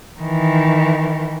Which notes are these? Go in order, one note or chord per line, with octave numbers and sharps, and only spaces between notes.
D#3 E3